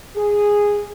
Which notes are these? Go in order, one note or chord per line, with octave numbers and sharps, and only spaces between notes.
G#4